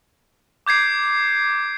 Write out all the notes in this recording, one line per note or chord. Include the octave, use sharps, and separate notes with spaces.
D6 G6 G#6 C7 D7